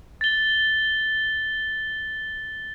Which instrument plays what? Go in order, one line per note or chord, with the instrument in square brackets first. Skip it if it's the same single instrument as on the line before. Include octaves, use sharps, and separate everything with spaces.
[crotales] A6 G7